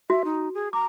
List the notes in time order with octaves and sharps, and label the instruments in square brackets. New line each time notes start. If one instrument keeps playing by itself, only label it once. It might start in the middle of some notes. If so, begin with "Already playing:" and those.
[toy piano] F#4 [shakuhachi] E5
[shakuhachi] D#4
G#4
[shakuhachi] A#5 [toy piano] D6